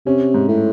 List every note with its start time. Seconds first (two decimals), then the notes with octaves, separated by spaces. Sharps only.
0.06 C3 C#4
0.34 G#2
0.48 A2